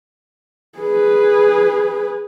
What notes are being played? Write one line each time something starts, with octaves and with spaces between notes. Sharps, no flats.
G#4 B4